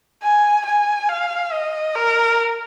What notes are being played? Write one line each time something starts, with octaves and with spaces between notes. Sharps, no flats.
G#5
G#5
F5
D#5
A#4